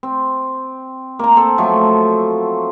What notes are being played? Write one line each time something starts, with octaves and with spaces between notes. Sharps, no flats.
C4
A#3 A#5
C4 A4
F3 F#3 A3